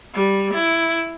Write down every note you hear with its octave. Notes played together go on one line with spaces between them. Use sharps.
G3
E4